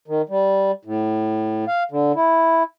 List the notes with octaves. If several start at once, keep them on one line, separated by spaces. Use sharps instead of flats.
D#3
G3
A2
F5
D3
E4